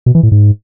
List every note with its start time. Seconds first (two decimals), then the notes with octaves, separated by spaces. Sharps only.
0.06 B2
0.15 E3
0.23 A2
0.32 G#2